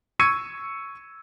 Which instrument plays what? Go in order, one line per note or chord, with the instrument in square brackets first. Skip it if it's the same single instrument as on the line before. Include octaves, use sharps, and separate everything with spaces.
[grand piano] C#6 E6 G#6 C#7 D#7